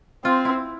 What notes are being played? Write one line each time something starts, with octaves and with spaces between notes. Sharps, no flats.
C4 F4
E4